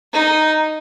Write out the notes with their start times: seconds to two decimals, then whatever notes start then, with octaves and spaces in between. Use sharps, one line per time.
0.13 D#4